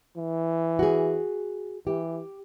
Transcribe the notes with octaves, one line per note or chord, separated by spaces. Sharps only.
E3
F#4 G#4
E3 G4